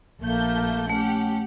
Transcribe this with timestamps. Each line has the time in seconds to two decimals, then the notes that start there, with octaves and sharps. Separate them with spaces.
0.20 A#1 A3 A#3 G6
0.90 A3 C#4 G4 F#5